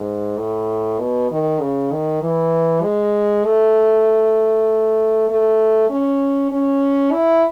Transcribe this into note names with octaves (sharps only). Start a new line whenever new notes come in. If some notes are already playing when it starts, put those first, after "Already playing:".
Already playing: G#2
A2
B2
D#3
C#3
D#3
E3
G#3
A3
A3
C#4
C#4
E4